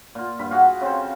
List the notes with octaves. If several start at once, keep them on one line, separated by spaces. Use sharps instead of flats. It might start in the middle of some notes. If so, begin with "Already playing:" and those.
A#2 F4
G2 B5
F#4 G#4 F5 F#5
C#3 C4 A4 C5